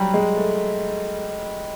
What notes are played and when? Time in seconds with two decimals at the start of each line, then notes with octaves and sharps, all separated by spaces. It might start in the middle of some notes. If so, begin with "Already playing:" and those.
Already playing: F#3 G3
0.14 G#3
0.36 A3